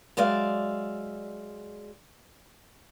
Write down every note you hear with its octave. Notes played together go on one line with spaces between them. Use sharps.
F#3 G#3 D5 E5 F5